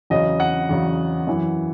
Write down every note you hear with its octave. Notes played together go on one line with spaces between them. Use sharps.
E2 C#3 F#3 D#5
F#5
E2 C#3 F#3
F#2 E3